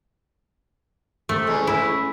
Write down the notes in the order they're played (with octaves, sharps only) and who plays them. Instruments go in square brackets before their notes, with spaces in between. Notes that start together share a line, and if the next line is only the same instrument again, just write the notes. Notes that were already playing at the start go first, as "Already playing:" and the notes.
[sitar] C3 [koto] A3
[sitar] E2 G#3 C#4
[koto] E4